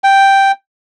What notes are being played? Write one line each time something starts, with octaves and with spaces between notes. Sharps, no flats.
G5